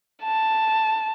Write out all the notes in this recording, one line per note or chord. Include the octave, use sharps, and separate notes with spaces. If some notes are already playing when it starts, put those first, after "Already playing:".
A5